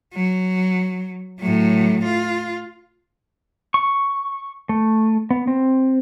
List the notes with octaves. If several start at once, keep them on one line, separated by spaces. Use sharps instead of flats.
F#3
A2 F#3
F4
C#6
A3
B3
C4